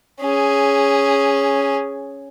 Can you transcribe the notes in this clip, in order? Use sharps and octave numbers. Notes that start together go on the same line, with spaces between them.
C#4 G#4